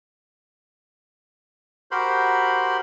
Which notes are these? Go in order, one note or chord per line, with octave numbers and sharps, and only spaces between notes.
F#4 G4 A#4 C5 B5 C6